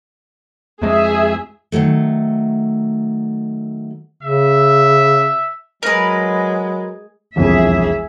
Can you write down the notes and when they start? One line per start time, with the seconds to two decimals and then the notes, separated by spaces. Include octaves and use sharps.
0.82 F2 G#3 G#4 E5
1.72 D#3 E3 F#3 A3
4.23 C#3 E5
5.83 F#3 G#3 A#4 B4
7.36 E1 C2 F2 G#4 E5